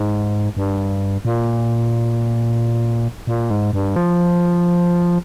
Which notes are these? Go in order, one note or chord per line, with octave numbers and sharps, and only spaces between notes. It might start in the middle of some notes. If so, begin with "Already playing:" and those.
Already playing: G#2
G2
A#2
A#2
G#2
G2
F3